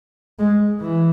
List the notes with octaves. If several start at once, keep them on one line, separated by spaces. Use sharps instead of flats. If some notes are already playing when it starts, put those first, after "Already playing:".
G#3
E3